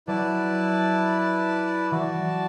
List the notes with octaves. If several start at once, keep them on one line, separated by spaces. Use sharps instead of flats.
F#3 E4 B4 D5 A5
E3 F#4 D5 A5
F#3